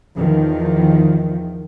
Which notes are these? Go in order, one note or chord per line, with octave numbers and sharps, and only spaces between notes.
E2 D#3 F3